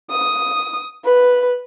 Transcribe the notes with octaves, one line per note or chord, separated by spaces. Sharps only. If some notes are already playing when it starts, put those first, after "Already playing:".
D#6
B4